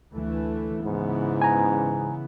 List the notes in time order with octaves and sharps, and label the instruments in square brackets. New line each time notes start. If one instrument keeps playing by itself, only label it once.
[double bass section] D2 E3 A3
[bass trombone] G#2 [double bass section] C#3 E3 B3
[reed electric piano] G#5 A#5